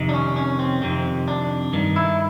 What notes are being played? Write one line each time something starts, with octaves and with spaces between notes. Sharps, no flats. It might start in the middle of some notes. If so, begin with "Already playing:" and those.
Already playing: F2 C3 D#3
D4
C#4
C#4
C4
F2 C3 D#3 C4
D4
G2 D#3
E4